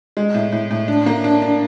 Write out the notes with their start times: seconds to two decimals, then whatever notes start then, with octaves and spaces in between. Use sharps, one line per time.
0.17 G#3
0.34 A2
0.52 A2
0.71 A2
0.88 D4
1.06 A#3
1.24 D4
1.42 D4